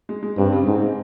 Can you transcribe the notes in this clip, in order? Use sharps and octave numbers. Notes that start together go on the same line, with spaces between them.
G#3
G#3
G2 C4
C#3
G#2 C4
G#3